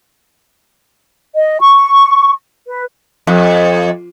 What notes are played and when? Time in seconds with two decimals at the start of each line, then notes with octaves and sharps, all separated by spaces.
1.34 D#5
1.61 C#6
2.67 B4
3.27 F2